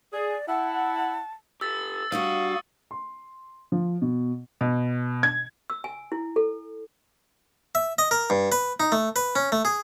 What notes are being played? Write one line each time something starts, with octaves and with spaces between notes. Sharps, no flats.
G#4 D5
E4 F#5 A5
G4 A4 E6 A6
G3 D4 F#4 F5 C#6 D#6 E6
C6
F3
B2
B2
G#6
E6
G#5
E4
A4
E5
D#5
A#4
G2
B4
D#4
A3
B4
C#4
A3
G#4